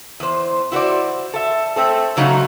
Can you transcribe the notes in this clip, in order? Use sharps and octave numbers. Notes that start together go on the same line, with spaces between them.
E2 C5
E4 F#4 C5 D5
A4 E5
A3 C4 A4
G#2 C#3 F#3 A3 D#4